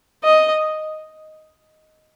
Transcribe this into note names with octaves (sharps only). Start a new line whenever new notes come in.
D#5